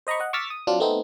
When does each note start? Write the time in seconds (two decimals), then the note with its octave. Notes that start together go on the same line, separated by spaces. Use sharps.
0.07 C5 D#5 A#5 B5 C#6
0.20 D#5 F#5
0.33 C#6 D6 E6 F6 A6 B6
0.50 D#6
0.67 F#3 C4 D4 F4
0.80 A3 B3 C4 D#4